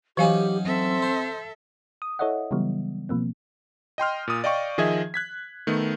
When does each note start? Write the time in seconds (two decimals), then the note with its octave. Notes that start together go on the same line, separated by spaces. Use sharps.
0.17 E3 F#3 C#4 D#4 G4 F5 G#5
0.66 C4 A4 E5
1.02 C5
2.02 D#6
2.19 E4 A4 C#5 D#5 E5 F#5
2.51 C#3 E3 F#3 G3 B3
3.09 B2 F3 A#3 C4
3.98 D#5 G5 C6 F6
4.28 A#2 D#6
4.44 D5 D#5 F5 G5 C#6
4.78 D#3 F3 G#4 D#5 E5 G#6
5.14 F#6 G#6 B6
5.67 D#3 A3 B3